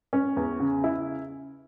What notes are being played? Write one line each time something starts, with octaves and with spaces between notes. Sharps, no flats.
C#4
E2
C#3
E4